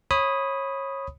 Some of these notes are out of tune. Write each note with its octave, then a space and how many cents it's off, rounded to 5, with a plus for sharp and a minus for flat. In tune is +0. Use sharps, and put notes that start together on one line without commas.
C#5 -25 B5 +0 D#6 +0